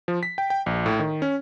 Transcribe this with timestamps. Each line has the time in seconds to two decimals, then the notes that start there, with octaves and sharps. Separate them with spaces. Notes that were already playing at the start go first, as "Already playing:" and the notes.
0.08 F3
0.23 B6
0.38 G5
0.50 G5
0.66 A#1
0.86 A2
1.00 D#3
1.22 C#4